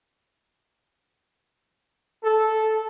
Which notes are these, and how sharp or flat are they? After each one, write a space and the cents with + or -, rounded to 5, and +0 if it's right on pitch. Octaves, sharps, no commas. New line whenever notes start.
A4 -10